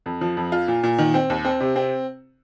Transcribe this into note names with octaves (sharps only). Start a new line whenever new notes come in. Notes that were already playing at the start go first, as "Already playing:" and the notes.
F2
F3
F2
F4
A#2
A#2
D#3
C4
D#2
C4
C3
C4